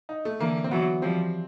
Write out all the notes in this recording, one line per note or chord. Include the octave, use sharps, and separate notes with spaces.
D#4
A3
D3 E3 A#3
C4
E3 F#3 B3
F3 G3 C4